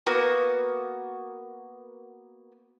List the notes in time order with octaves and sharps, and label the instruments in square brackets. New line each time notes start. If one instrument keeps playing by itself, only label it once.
[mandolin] A#3 B3 F#4